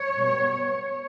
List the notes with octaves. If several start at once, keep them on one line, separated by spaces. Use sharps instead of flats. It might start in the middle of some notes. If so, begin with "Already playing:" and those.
Already playing: C#5
B2 G3 B3